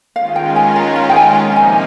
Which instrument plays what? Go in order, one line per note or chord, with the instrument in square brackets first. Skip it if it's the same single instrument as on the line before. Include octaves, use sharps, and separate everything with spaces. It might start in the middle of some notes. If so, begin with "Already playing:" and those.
[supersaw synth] D#3 G#3 C#4 F4 [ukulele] F5
[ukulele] G5
G#5
A#5
A#5
G5
G#5
[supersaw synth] C3 F3 A#3 D#4 [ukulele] A#5
[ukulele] A#5
G#5